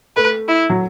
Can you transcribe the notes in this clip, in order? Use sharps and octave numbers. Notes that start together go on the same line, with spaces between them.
A3 B4
E4
F#3